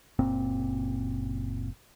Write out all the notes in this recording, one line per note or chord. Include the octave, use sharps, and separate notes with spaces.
F#1 A#2 C4